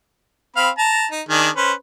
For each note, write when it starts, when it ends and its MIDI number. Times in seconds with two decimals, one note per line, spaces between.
0.56 0.70 60
0.56 0.70 77
0.56 0.70 83
0.78 1.07 81
0.78 1.07 82
1.11 1.22 63
1.28 1.49 51
1.28 1.49 62
1.28 1.49 68
1.56 1.73 61
1.56 1.73 71
1.56 1.73 72